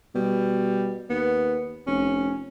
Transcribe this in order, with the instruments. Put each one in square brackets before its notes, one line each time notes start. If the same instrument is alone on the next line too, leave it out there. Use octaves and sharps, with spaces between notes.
[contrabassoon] B2 [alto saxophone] G3
[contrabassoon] D#2 [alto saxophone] B3
[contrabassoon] F1 [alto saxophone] C#4